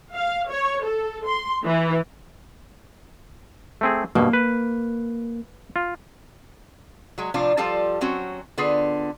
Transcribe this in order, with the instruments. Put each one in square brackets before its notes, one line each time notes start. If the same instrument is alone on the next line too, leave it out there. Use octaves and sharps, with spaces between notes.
[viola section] F5
C#5
A4
C6
E3
[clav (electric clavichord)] A3 C4 G#4
[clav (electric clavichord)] G2 B2 [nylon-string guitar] A#3
[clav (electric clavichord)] B4
F4
[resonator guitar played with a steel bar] F#3 G#3
A2 C3 F3 D4 F4
F3 G3 F4 A4 F5 A5
F#3 C4 C#4 F#4
D3 B3 F4 G#4